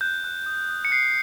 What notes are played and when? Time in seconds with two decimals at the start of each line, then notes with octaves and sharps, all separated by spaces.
0.01 F#6 G6
0.24 F#6
0.46 D#6
0.69 D#6
0.85 C#7
0.91 F#6 C7